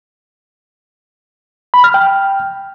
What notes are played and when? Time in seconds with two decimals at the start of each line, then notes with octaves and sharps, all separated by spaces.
1.74 B5
1.84 F6
1.94 G5